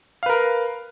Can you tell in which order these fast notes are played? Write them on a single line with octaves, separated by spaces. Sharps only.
F5 B4 A#4